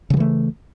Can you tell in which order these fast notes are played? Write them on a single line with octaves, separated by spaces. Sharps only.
C#3 F#3 E3 A3